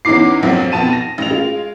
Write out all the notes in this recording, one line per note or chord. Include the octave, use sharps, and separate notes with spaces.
E2 C#4 D#4 E4 D6 C7
A#1 F2 F3 F#3
F2 B2 A5 D#7
A#6
A1 F7
G#3 F4